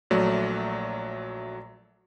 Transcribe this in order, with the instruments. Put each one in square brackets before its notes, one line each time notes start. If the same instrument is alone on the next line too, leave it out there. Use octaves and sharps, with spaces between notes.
[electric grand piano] A#1 F#3 A3 D5